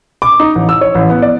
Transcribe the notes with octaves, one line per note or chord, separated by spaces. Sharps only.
D6
D#4
A1
E6
C#5
A1
B3
D5